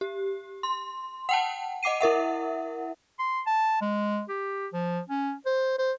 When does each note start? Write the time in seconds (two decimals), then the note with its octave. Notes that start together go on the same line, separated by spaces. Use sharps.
0.01 G4
0.63 C6
1.29 F#5 G5 A5
1.83 D#5 F#5 D6 C7 D#7
2.01 E4 A#4 E5 F#5
3.19 C6
3.46 A5
3.81 G#3
4.29 G4
4.73 F3
5.09 C#4
5.46 C5
5.79 C5